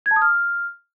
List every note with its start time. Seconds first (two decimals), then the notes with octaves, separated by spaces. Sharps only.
0.06 G#6
0.11 A5
0.16 D#6
0.22 F6